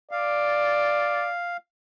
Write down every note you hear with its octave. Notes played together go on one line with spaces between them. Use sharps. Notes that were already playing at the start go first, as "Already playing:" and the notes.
D5 F5